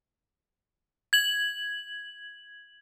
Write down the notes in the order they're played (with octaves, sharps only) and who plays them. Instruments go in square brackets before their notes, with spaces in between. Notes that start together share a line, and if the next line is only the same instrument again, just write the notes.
[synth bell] G#6 F#7